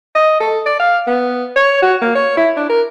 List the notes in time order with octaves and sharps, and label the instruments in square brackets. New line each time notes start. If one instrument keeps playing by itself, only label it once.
[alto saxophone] D#5
A4
D5
F5
B3
C#5
F#4
A#3
C#5
E4
D4
A#4